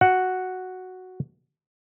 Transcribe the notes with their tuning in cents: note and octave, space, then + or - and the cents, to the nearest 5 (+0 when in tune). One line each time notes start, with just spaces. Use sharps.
F#4 +0 F#5 +0